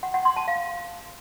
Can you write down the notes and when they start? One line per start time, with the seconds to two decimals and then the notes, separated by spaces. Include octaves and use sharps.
0.03 F#5
0.14 F#5
0.25 C6
0.36 A5
0.48 F5